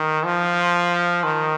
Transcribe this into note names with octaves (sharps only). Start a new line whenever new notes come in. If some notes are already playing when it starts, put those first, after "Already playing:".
Already playing: D#3
F3
D#3